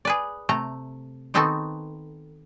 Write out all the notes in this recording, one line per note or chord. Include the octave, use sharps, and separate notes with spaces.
G#4 B4 D5
C3 A3 A#5
D#3 B3 C4 D#4 F#4 A4